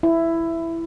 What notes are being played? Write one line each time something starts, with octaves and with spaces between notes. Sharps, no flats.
E4